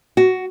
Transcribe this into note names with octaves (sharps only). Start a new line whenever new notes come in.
F#4